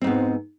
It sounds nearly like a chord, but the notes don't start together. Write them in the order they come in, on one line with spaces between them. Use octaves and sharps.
C4 G#2 B3